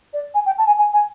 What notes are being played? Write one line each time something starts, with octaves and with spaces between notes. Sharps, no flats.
D5
G#5
G5
A5
G#5
G#5
G#5